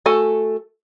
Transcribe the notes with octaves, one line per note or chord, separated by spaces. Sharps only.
A3 F#4 A4 G#5